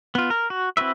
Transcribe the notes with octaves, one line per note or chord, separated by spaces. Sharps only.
B3 F4
A#4
F#4
C4 E4 F#4 B4 E5